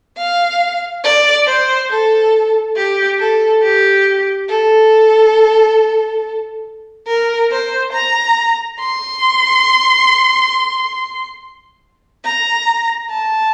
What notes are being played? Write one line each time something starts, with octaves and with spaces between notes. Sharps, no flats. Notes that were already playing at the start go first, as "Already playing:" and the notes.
F5
D5
C5
A4
G4
A4
G4
A4
A#4
C5
A#5
C6
A#5
A5